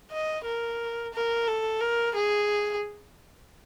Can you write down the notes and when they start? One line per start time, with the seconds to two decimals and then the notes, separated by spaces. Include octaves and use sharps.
0.11 D#5
0.46 A#4
1.14 A#4
1.48 A4
1.81 A#4
2.15 G#4